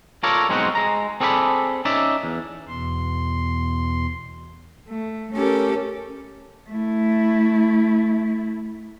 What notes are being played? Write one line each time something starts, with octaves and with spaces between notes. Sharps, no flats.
F4 A4 A#4 C#5 D5
B1 G#3 C4 C#4 D#4 F#4
G#3 A#5
C4 G#4 A4 D5 F#5 B5
C#4 D#4 D5 E5
E2
E2 B2 C6
A3
A3 C#4 G4 A4 A#4
A3 E4